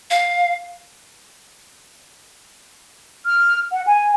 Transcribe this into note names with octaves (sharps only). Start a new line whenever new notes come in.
F5
F6
F#5
G#5